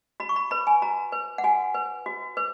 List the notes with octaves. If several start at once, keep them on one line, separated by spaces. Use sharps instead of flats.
F#4 B5
C#6
B5
B4 B5
G#5
F#4 A#5
B4
F#5
F#4 G#5
B4
F#4
B4